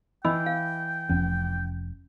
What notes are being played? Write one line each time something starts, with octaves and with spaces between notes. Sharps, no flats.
E3 D#5 G5 B5 E6
F5
F1 F2 C#4